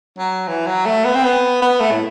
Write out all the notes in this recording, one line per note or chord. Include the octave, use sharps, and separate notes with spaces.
F#3
E3
F#3
A3
B3
C4
B3
B3
A3
A2